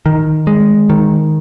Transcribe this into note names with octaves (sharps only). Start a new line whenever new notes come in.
D#3
G#3
D#3